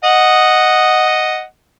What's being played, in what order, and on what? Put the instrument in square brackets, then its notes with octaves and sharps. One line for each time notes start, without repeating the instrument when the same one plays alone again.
[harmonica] D#5 F#5